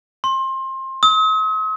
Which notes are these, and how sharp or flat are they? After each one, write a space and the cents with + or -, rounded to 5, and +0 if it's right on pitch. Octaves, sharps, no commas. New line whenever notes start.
C6 +25
D#6 +45